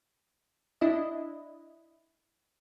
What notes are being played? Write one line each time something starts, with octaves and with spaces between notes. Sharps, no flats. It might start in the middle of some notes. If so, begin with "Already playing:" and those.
D4 E4 D#5